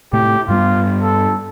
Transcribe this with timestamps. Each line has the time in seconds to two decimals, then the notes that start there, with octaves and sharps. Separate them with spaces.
0.13 A2 C3 A3 G4
0.48 G2 G3 B3 F4
1.03 A4